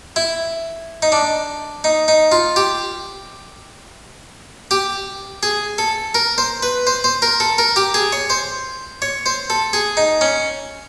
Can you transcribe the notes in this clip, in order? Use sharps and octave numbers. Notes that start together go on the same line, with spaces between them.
E4
D#4
D4
D#4
D#4
F4
G4
G4
G#4
A4
A#4
C5
B4
C5
C5
A#4
A4
A#4
G4
G#4
C#5
C5
C#5
C5
A4
G#4
D#4
C#4